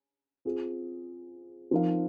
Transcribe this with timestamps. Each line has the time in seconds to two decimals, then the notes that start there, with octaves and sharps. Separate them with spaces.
0.45 C4 F4 G#4
1.71 F3 C4 D#4 A#4 F5